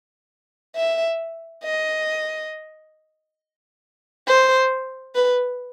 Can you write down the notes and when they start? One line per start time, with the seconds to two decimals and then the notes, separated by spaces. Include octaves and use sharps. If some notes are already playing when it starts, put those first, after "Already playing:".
0.76 E5
1.64 D#5
4.27 C5
5.15 B4